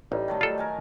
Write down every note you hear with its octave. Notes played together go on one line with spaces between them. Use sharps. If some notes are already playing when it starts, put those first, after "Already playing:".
A1 G3 D#4
D#3 F#3 A3
F4 A4
A#4 G#5 A5